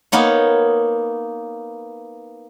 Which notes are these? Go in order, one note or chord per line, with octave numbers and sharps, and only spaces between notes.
A#3 B3 D#4 C#5